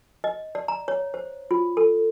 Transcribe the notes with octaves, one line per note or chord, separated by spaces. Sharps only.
D#5
D5
A#5
C#5
C5
F4
A4